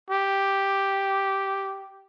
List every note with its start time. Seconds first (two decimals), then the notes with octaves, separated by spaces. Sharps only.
0.10 G4